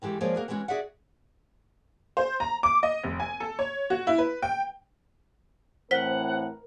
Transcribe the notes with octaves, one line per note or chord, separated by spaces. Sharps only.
D#3 E3 G#3 G4 A4
F3 G#3 A#3 G#4 C#5 D5
A#3 F#4 G#4
E3 G3 G#3 C#4 F#4
F#4 G#4 D5 E5 F#5
C5
A#5
D6
D#5
F1
G#5
A4
C#5
F#4
E4
B4
G5
A2 E3 C4 A#4 C5 F#5 B6